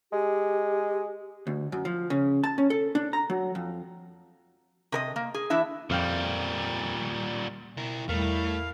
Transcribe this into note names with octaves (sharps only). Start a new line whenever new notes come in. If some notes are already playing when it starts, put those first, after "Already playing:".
G#3 G4
D2
F#2
F3
C#3
A5
C#4
A4
D4
A#5
F#3
F2
C3 A#4 D#5
A#3
G#4
E3 D4 E4 E5
F2 A#2 G3 F5 G5
B2 E4 A#4
E2 A2 G3 A3 E4 A#4 F5